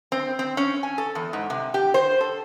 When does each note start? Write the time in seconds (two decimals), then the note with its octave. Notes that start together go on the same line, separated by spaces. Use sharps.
0.12 C4
0.39 C4
0.57 C#4
0.83 G#5
0.98 A4
1.15 E2
1.33 G#2
1.50 C3
1.74 G4
1.94 C5
2.21 A4